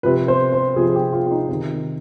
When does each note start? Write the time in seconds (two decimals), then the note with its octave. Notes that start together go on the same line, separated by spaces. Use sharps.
0.03 C3 F3 B4
0.28 C5
0.52 C5
0.76 C3 F3 G#4
0.90 G#4
0.95 G4
1.12 F4
1.26 F4
1.31 D#4
1.49 C3 D#3 D#4